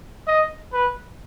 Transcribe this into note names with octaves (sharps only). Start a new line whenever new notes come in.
D#5
B4